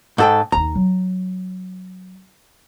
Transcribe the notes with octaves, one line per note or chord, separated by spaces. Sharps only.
G#2 A4 G5
D#2 D#4 A#5
F#3